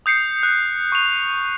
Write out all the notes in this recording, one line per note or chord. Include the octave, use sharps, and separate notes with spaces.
D#6 G6 C7 C#7
F#6
C#6 F7